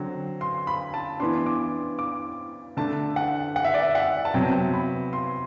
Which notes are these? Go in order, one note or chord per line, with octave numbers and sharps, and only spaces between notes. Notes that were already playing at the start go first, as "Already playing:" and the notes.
Already playing: D3 F#3 C4
C6
B5
A5
E3 B3 D4 C6
D6
D6
D3 A3 D4 A5
F#5
F#5
E5
D5
E5
F#5
A5
C3 F#3 B3 G5
B5
C6